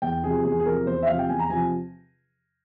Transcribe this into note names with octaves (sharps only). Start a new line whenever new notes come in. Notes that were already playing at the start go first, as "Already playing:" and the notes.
E2 G5
C3 F3 G#4
E2 G#4
G#4
C3 F3 A#4
E2 C5
E5
C3 F3 F5
G5
E2 G#5
A#5
C3 F3 G#5